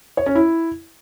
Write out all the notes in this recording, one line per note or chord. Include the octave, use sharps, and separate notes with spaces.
C#5
C#4
E4